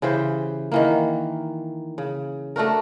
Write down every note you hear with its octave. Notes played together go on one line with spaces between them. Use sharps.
C#3 E3 G4 C5
D#3 E3 A#3
C#3
A3 D4 F#4 A#4